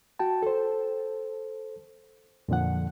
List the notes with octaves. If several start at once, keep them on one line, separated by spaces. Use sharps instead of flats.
F#4 G5 A5
A4 C5
F2 A#2 D3 F3 F#5